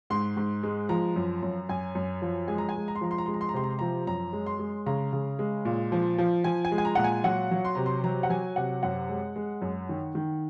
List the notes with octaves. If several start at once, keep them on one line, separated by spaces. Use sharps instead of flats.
G#2 C6
G#2
G#3
F3 A#5
F#2
F#2
F#2 G#5
F#2
F3
G#3 G#5
A#5
G#5
G#3
A#5
C6
F3 A#5
C6
A#5
G#3 C6
A#5
C6
A#5
C3 C6
A#5
C6
F3 A#5
F#2 A#5
G#3
C6
G#3
C#3 A#5
C#3
G#3
A#2
F3
F3
F3 G#5
G#5
G#3
G#5
A#5
A#2 F#5
G#5
F#3 F#5
F#3
C6
C3 A#5
C6
F#3 A#5
F#5
F#3 G#5
C3 F#5
F#2 F#5
G#3
G#3
F#2
D#3
D#3